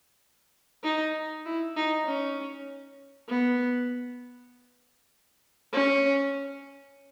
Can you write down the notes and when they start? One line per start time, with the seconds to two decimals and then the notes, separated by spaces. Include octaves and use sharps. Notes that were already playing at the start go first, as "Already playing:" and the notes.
0.84 D#4
1.45 E4
1.76 D#4
2.07 C#4
3.29 B3
5.73 C#4